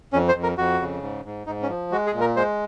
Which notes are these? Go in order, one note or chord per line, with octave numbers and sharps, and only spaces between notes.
F2 C#4
C5
F2
A#4
F2 F#4
C#3
G#2
G#2
G#2 D#4
C#4
F3
G#3 F#4
G#4
A#2
A#4
G#3 C5